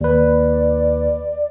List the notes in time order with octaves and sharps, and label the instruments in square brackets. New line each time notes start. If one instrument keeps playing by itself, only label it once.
[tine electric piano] D#2 B4 [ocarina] D5